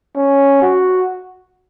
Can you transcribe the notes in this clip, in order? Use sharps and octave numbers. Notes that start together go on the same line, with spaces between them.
C#4
F#4